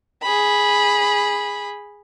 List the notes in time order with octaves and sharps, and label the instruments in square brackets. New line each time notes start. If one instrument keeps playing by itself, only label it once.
[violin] G#4 B5